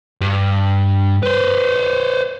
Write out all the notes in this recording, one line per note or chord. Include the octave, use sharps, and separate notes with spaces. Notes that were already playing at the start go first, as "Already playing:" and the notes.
G2
B4 C5